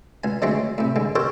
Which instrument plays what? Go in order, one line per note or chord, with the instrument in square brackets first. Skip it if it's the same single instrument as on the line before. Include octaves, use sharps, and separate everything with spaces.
[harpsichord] C#2 G#5
D3 F#3 G#3 A3 C4 D#4
A2 C3
D3 G#3
D#4 G4 A4 A#4 C5 C#5